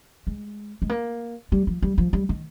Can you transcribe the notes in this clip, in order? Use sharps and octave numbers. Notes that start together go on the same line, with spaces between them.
G#3
G#3
A#3
G3
F3
G3
F3
G3
D#3